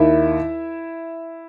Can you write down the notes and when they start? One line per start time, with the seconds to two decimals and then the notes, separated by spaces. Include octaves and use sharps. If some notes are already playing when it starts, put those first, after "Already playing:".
Already playing: D#2 D#3 E4 E5